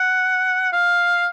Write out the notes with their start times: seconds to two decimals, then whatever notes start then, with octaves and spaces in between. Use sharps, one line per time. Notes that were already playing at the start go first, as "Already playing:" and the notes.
Already playing: F#5
0.73 F5